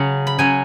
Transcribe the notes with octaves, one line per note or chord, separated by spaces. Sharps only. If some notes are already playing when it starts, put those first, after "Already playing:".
Already playing: C#3 F#3 C#4
B5
C#3 F#3 C#4 G#5